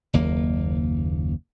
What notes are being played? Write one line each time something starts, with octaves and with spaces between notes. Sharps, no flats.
F#1 D#2 A#3